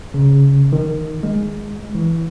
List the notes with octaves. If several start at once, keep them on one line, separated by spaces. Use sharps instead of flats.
C#3
D#3
G#3
E3